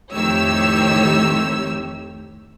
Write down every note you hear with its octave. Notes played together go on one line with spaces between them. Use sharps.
F2 A2 D#3 G4 C#5 E6